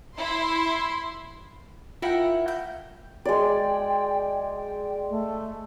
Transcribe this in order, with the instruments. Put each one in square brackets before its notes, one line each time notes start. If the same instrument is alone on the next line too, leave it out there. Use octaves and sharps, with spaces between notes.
[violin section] E4 C6
[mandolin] E4 A#4 F#5 [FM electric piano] F4 G5
[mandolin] G6
[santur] G#3 D5 [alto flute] G5
[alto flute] G5
A3